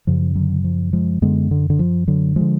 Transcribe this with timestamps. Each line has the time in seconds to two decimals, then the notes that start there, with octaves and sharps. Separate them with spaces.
0.07 F#2 C#3 F3
0.35 D3 F#3
0.64 F3
0.93 F3 G#3
1.22 F#2 D3 G#3 B3
1.51 D3
1.70 D3
1.79 F3
2.07 D3 F#3
2.36 D3 F3 G#3